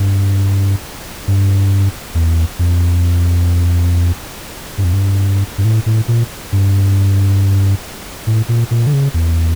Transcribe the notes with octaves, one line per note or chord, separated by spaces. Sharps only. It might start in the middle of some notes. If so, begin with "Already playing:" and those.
Already playing: G2
G2
E2
F2
G2
F2
G2
G2
A2
A2
A#2
G2
A2
A#2
A#2
D3
C#3
E2